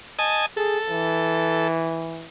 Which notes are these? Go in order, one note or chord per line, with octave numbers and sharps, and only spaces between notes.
D#5 G#5 A5
G#4 A4
E3